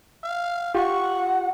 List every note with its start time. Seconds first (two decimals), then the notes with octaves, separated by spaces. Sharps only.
0.24 F5
0.75 F4 G4 F#5 C#6